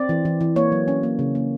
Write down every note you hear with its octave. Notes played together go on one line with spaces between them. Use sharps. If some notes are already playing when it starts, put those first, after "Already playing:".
Already playing: C4 D5
E3
E3
E3
A#3 C#5
F#3
C#4
A#3
C#3
A#3